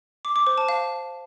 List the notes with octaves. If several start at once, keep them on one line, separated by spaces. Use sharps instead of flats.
D6
D6
C5
A5
F5